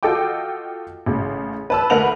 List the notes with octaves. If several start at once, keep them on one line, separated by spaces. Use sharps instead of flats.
F4 F#4 A4 D#5 G5 D6
A1 C#3
B4 A5 E6
D2 A#4 B4 F#5 F7 F#7